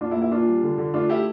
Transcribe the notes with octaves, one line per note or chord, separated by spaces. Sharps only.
A#2 D4 F4
E4
A#3
E4
A#2 D4 F4
G3
D3
D3
A3 D4 F4
A3 E4 G4